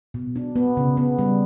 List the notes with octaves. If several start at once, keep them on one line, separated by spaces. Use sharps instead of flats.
B2
D4
B3
C#3
B3
G3